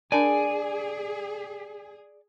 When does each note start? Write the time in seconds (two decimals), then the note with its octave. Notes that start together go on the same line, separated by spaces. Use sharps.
0.12 D4 G#4 A#4 D5 G#5 A5